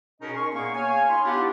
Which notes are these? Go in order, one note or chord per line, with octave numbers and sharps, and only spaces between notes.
B2 C#4 D#4 G#4 A#4 D#5
C#4 C6 C#6
A#2 A#3 B3 G#4 F5 C#6
C#5 F5 G#5
D#4 F4 F5 B5 C6
B3 D4 E4 G4